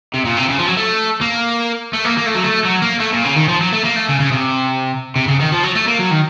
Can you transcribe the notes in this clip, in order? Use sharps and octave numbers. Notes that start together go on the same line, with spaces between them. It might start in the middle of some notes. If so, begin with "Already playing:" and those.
C3
A#2
C3
C#3
F3
F#3
A3
A#3
A3
A#3
A#3
A3
F#3
A3
F#3
A#3
A3
A#2
C#3
D#3
F3
F#3
A3
A#3
A3
C#3
C#3
C3
C3
C#3
D#3
F3
F#3
A3
A#3
F#3
D#3